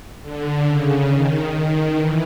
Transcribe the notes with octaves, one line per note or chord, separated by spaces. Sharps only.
D3
C#3
D#3
D#3
E3